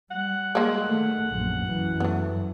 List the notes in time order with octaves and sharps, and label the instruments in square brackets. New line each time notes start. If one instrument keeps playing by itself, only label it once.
[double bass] G3 [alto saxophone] F#5
[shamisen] G#3 A#3
[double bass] D#3 A3
A#1 F#2
F#2 E3
[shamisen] A3 B3